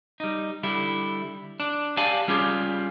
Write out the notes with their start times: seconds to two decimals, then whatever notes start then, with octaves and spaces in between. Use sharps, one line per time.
0.20 G3 D#4
0.63 D3 G3 E4
1.60 D4
1.97 G4 D5 F5 G#5 A5
2.28 G3 C#4 F4 G4 G#4